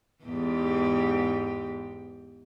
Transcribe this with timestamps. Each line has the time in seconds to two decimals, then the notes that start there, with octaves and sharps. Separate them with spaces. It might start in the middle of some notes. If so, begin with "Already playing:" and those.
0.24 E2 G#2 G4